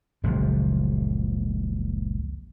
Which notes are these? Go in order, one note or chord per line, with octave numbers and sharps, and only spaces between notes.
F#1 C#2 A#2 F3